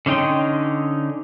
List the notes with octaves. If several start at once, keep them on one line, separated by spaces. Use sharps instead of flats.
D3 C#4 D#4 G5 C6